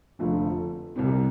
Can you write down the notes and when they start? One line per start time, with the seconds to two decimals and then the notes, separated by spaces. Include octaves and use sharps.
0.19 F1 F2 D3 F3 A3
0.96 C2 C3 G3 C4